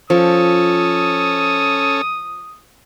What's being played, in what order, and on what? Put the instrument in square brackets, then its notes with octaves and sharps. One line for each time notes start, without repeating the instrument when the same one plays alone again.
[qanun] F3 [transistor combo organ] C#4 A4 [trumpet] D#6